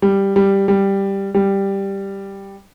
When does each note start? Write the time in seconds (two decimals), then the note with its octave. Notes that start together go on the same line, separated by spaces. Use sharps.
0.02 G3
0.36 G3
0.68 G3
1.34 G3